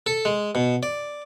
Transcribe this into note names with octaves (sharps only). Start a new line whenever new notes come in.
A4
G#3
B2
D5